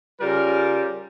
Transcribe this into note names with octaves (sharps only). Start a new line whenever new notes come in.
C#3 G3 F4 A#4